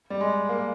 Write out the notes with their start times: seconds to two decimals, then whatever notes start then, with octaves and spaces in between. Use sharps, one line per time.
0.10 G3
0.21 G#3
0.49 A#3